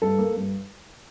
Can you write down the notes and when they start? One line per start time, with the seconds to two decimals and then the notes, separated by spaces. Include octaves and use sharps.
0.02 G2 A4
0.19 A#3
0.36 G2